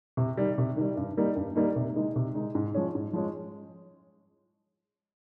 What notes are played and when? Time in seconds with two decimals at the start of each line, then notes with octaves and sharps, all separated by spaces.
0.17 C3
0.37 D#3 G3
0.58 C3
0.77 D#3 G3
0.97 G2
1.17 D#3 G3 A#3 D#4
1.36 G2
1.56 D#3 G3 A#3 D#4
1.76 C3
1.95 D#3 G#3 D#4
2.16 C3
2.35 D#3 G#3 D#4
2.55 G#2
2.74 F3 G#3 C#4
2.95 G#2
3.13 F3 G#3 C#4